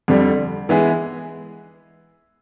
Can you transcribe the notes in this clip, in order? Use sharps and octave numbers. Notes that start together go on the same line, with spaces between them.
F2 D3 G3
E3 G#3 B3 E4 G#4